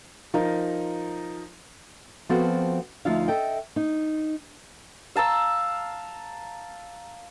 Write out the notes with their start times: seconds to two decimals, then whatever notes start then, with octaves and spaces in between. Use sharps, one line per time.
0.34 F3 D#4 A#4
2.29 F3 B3 C4 F#4 A4 C5
3.05 D2 F3 D#4 F4 E5 F5
3.28 A4 D#5 E5 G5
3.76 D#4
5.16 F5 A5 A#5 E6